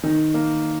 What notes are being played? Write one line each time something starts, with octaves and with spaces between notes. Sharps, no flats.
D#3
A#3